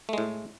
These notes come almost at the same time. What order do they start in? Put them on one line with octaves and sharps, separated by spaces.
A3 G#3 A2